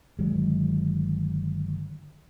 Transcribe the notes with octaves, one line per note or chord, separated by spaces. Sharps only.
G1 D#3 F#3 G#3